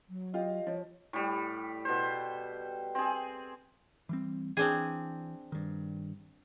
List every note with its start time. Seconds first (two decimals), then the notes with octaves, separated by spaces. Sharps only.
0.09 F#3
0.34 F4 G4 D#5 F5
0.67 F3 C#5
1.13 A2 G3
1.85 B2 C5
2.95 C4 G#4
4.09 E3 G3 C4
4.57 E3 C4 D4 G#4
5.52 G2 D#3